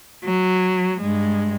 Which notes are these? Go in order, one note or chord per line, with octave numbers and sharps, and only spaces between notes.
F#3
G2 G#3